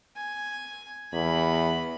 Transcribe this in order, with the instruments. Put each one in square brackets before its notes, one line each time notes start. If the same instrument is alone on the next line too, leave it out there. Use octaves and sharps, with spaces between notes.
[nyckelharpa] G#5
[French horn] E2 [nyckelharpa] B5